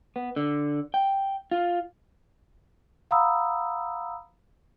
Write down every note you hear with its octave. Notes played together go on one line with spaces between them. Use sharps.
B3
D3
G5
F4
F5 F#5 A#5 B5 D#6 E6